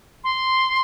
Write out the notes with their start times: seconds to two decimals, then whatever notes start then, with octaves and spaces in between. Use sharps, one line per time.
0.24 C6